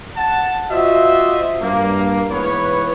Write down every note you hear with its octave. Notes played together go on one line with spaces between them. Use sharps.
F#5 A5
F4 F#4 C5 D#5 E5
G2 A#3
G#2 E3 B3 B4 C#5